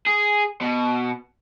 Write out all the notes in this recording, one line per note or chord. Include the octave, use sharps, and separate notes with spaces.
G#4
B2